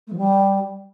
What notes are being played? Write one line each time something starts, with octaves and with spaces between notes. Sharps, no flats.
A3
F3
G3